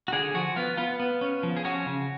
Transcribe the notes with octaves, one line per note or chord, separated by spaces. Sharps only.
F#4
D3 G#4
F3 F#4
B3 F4
B3 F4
B3
C#4
F3
G#4
C#4 F#4
C#3